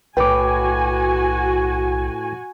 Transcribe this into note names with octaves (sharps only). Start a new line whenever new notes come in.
B1 A2 F#4 B4 G5 G#5 D6